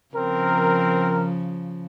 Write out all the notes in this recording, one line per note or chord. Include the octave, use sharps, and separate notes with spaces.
C#3 F3 C4 A#4